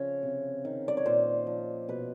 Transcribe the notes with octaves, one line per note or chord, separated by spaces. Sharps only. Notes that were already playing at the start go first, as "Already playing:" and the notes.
Already playing: C#3 F3 C#5
C3
D#3
D5
C#5
A#2 C5
F3
B2 B4